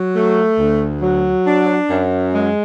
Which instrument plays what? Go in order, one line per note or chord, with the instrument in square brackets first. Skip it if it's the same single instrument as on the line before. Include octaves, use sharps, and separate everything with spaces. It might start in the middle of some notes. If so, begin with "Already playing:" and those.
Already playing: [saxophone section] F#3
A3
D2
F#3
D4
F#2
G#3